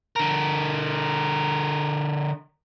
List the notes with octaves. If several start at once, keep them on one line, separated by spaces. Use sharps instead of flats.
D3 A#4